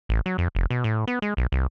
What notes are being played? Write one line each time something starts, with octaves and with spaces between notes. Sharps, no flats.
A1
F#3
F2
F1
B2
A2
B3
G#3
B1
C2